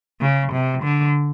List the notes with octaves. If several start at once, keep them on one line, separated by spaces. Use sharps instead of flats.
C#3
C3
D3